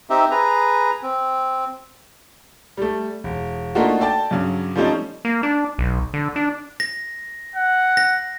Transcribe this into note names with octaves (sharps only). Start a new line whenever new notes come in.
C4 D#4 G4 E5
G#4 B4 A#5
C4
G3 A3
E1
A3 A#3 D4 D#4 F4 F#4
A4 D5 G5 A5
G2 C#3 F#3
F3 G3 A3 C4 C#4 D#4
A#3
D4
B1
D3
D4
A#6
F#5
A#6